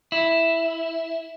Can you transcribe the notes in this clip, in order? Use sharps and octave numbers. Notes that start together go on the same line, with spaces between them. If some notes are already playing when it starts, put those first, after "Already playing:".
E4